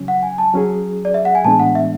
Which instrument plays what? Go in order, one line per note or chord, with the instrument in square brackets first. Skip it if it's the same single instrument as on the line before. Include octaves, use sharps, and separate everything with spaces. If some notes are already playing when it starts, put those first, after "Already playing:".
Already playing: [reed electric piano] C#3 F#3 C#4
[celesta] F#5
G#5
A5
[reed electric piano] F#3 C#4 G#4
[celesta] D5
E5
F#5
G#5
[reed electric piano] A2 E3 G#3 B3 D4 [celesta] A5
[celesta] F#5
E5